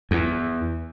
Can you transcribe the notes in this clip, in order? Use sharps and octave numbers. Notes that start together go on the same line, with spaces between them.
E2